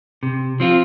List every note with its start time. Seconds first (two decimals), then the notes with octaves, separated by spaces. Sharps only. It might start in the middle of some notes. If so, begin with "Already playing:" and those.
0.23 C3
0.60 F3 C4 F4